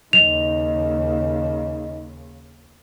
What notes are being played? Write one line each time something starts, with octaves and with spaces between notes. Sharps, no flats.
D#2 C#3 D#4 F7